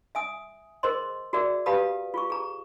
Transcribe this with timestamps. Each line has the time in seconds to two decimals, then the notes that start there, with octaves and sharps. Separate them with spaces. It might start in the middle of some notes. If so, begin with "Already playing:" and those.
0.15 E5 G#5 D#6
0.83 G#4 A#4 C5 D#5 C6
1.33 F#4 G#4 A#4 D5 E5
1.66 G4 B4 F5 A5 B5 D#6
2.14 F4 G#4 C#6
2.30 G#4 A#5